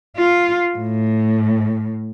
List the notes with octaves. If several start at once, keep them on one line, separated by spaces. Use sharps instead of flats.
F4
A2